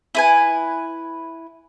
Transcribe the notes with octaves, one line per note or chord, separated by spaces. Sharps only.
E4 B4 G#5